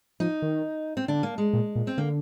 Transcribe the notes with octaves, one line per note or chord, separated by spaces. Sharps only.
F3 D#4
D#3
C4
D3 D4
A#3
G#3
A#2
A#2
C4
D3 A#3